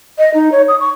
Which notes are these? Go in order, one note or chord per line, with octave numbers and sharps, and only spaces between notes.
D#5
D#4
C#5
D#6
C#6